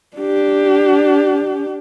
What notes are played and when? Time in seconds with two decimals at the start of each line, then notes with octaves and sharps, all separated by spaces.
0.17 D4 G4